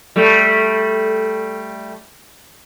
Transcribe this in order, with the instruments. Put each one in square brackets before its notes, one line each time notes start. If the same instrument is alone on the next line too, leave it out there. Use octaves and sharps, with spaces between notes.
[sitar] G3 A3